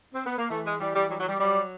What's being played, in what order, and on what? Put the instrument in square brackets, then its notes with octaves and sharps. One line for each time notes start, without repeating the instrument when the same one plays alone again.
[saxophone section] C4
B3
A#3
E3 A3
G#3
E3 G3
G3
F#3 G3
F#3
G3
F#3 G3